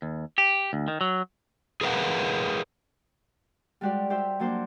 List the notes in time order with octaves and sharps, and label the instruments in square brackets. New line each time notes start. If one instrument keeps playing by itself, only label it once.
[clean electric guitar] D#2
G4
D2
D#3
F#3
[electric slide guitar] G#4 A#4 B4 F5 F#5
[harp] G3 G#3 F#4 G4 C5 D5
G4 C5 E5 G5
F#3 A#3 D4 C5 D6 G6